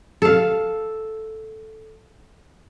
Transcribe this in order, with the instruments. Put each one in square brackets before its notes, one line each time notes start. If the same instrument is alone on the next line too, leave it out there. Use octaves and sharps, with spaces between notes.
[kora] A4 F5